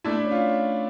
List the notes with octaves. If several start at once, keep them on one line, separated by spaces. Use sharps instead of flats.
A3 D4 E4
C#4
F4